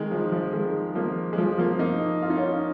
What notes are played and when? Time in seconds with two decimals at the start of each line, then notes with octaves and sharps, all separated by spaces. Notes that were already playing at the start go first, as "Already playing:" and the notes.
Already playing: D#3 G#3
0.11 F3
0.32 F3
0.53 D#3 G#3
0.95 F3 A#3
1.33 G#3
1.38 F3
1.59 F3 A#3
1.79 A#3 D#4
2.22 F4
2.30 D#4
2.37 C#4 F4